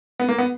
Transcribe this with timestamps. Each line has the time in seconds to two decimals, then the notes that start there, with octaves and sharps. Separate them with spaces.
0.19 B3
0.29 A#3
0.38 B3